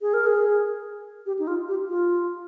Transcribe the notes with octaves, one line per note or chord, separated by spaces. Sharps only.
G#4
A#4
G#4
G4
D#4
F4
G4
F4